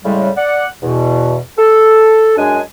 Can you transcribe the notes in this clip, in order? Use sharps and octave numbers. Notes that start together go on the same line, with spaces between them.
A2 C#3 G3 G#3
D5 F#5
E2 B2
A4
F#2 G#3 D4 G#5